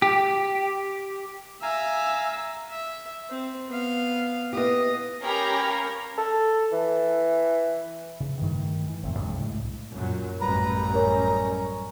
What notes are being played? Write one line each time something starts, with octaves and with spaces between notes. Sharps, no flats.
G4
E5 F5 G#5 A#5
E5
C4
B3 F5
B3 E4 G4 D#5
C#4 G4 A#4 C#5 F5 A#5 B5
A4
E3
C#3
G2 D#3 G3 A3
E3
D#1 F2 A3 C4
C#2 G2 B2 F#3
C2 A2 G3 G#3
F#2 A#2 F#3
A1 F#2 G3 B4 A#5
C#4 A#4 C#5